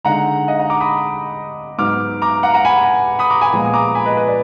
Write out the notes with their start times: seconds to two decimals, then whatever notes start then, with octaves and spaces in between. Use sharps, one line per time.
0.04 D3 G#3 D#4 F#5 A#5
0.48 D#5 F#5
0.59 F#5 A#5
0.70 A#5 D6
0.80 B5 D#6
1.78 G#2 F#3 B3 D#4 D6 F6
2.22 A#5 D6
2.43 F#5 A#5
2.54 F#5 A#5
2.65 G#5 B5
3.19 B5 D#6
3.30 A#5 D6
3.41 G#5 B5
3.53 A#2 F3 G#3 B3
3.65 D#6
3.74 A#5 D6
3.95 G#5 B5
4.06 B4 D#5
4.17 B4 D#5
4.28 D5